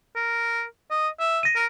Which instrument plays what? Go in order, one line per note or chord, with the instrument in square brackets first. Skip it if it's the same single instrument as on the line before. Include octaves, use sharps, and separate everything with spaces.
[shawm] A#4
D#5
E5
[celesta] A#6 D#7
[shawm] A#4